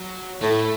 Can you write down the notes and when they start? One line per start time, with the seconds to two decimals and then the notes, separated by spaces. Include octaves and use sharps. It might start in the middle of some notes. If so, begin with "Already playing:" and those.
Already playing: F#3
0.42 A2 A3